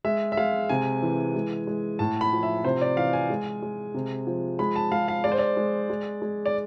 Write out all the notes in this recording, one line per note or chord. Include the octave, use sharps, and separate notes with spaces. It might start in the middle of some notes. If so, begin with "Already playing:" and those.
G#3 E5
E5
G#3 F5
C3 G#5
E3
G#3
G#3
A2 A5
B5
F3
E5
C3 C5
D5
E3 F5
G#5
G#3
G#3
C3
F3
G#3 B5
A5
G#3 F5
F5
G#3 D5
C5
D5
G#3
G#3
G#3
D5